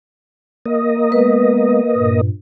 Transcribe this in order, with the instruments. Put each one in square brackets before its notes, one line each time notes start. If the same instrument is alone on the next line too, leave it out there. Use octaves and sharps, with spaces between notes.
[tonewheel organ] A#3 D#5
[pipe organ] G#3 B3 [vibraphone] B4
[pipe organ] G2 A#2